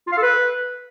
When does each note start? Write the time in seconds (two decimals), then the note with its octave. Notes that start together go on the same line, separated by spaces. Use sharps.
0.07 F4
0.12 F5
0.17 A4
0.23 B4